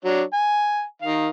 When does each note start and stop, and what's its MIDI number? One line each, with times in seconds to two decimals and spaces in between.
0.05 0.22 54
0.05 0.22 62
0.05 0.22 73
0.33 0.83 80
1.02 1.28 51
1.02 1.28 77